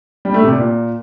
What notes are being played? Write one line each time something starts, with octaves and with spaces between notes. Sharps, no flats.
G3
A3
C3
A#2